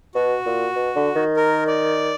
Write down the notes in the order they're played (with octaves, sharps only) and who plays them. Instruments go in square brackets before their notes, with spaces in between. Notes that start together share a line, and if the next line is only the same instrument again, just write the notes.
[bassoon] B2 [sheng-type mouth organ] F#4
[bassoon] A#2
B2
D3
D#3
[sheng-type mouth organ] A#4
D5